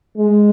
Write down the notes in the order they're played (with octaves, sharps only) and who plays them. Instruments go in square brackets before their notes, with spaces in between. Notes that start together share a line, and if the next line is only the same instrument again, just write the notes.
[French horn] G#3